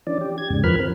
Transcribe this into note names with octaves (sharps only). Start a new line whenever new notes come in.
E3 C#4 D4 D5
G4
G#6
E2 G#2 C#3
F2 F3 A#4 B4 B5 F6
C4